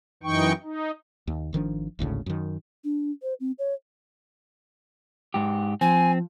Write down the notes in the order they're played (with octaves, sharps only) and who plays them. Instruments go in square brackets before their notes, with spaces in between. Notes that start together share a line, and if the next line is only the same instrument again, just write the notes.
[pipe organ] F#2 E3 D#4 G5 C#6
D#4
[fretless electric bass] D#2
G#1 D#3 F3 D4
G#1 D2 A2 C#3
F#2 D#3
[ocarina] D4
C5
C4
C#5
[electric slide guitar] G#2 G4
[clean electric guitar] F3 [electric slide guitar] C4 [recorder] G#5